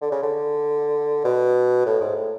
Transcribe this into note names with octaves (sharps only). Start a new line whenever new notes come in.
D3
C#3
D3
B2
A2
G#2
A2